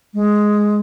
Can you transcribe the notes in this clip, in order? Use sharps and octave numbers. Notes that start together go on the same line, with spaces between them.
G#3